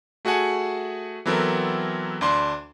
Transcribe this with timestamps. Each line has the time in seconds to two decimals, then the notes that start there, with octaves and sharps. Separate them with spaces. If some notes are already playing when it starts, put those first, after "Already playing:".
0.25 A3 F#4 G#4 F#5 G#5 A5
1.26 E3 F#3 B3 C4 A4 A#4
2.21 D2 D4 C6